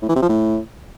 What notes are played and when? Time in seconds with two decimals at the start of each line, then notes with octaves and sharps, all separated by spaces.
0.02 A2
0.09 E3
0.15 C3
0.22 F3
0.29 A2